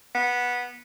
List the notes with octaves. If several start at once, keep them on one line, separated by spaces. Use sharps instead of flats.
B3